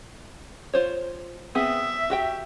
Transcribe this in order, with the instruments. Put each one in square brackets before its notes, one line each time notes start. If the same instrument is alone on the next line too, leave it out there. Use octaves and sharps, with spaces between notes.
[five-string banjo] F4 C5 C#5
[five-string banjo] B3 C4 G#4 [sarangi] E5
[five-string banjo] F#4 G4 G5